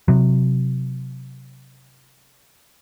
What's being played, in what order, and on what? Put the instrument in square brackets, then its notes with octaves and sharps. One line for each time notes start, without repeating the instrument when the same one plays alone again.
[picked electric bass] C3 F#3